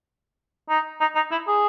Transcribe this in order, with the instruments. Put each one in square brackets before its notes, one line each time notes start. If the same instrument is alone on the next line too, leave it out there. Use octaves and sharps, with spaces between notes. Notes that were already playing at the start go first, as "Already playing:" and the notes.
[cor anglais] D#4
D#4
D#4
E4
G#4